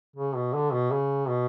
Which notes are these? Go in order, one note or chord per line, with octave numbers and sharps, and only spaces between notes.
C#3
B2
D3
B2
C#3
B2